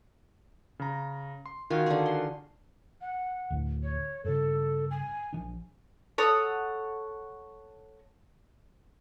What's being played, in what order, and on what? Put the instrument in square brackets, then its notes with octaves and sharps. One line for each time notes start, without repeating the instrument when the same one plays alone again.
[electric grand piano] C#3 A#5
C6
[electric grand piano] D#3 F#4 [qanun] F4 G#5
[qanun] D3 G#4
C6
[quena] F#5
[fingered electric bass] D2 A2 D3
[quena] C#5
[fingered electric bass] G2 C#3 [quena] A4
[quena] G#5
[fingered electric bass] A#1 F3 D4
[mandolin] A4 C#5 F#5 D#6